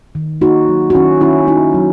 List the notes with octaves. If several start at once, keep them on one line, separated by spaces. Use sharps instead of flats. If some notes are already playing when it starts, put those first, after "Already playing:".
D#3
A#3 D#4 F#4
F#3
F#4
D#3 C#4 E4
D#3 C#4 E4
A#3 D#4 F#4
F#3